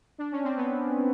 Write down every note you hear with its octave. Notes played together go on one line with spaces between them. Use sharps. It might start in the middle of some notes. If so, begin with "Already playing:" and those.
D4
C#4
C4
B3